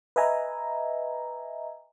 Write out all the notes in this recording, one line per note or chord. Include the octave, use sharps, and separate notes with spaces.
B4 D#5 E5 G#5 A#5